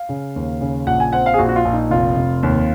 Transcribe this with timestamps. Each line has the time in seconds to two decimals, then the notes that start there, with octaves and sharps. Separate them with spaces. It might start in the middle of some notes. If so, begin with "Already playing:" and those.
Already playing: F5
0.09 C#3
0.36 D#2
0.61 C#3
0.87 A#1 F#5
1.00 G#5
1.12 C4 F#5
1.26 F5
1.34 G#4
1.38 A#1 F#4
1.49 F#4
1.56 F4
1.65 A#1
1.73 D#4
1.91 F1 F4
2.17 F1
2.43 D#2